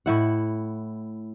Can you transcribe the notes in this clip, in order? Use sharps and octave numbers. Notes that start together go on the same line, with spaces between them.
A2 E4 F#5